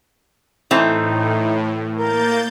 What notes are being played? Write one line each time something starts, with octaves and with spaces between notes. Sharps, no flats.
A2 E3 A3 C4 D#4
A#3 A#4 G6 A6